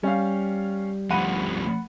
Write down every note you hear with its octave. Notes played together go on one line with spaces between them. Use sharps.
G3 C#4 F5
D2 F3 F#5 B5 D#7